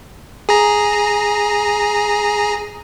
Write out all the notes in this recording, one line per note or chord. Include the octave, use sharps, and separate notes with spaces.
G#4 A#5